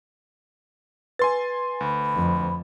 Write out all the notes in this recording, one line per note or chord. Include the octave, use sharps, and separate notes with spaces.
B4 G#5 C6 A6
D2 B5
F2